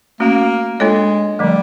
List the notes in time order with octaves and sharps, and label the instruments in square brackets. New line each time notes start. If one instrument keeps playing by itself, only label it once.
[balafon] A3 C#4 F#4 [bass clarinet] A#3
[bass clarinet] G#3 [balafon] A#3 D4 F4 A4 C#5
[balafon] D3 F3 A3 [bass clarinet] G3